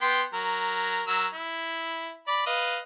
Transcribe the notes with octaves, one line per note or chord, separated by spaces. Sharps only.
B3 G5 C6
F#3 A#4
F#3 A#4 E6
E4
D5 B5
B4 D#5 F5